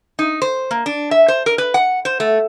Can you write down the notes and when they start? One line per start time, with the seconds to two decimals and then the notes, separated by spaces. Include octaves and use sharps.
0.19 D#4
0.42 C5
0.71 A#3
0.86 D4
1.11 E5
1.28 C5
1.46 A#4
1.58 B4
1.74 F#5
2.05 C5
2.20 A3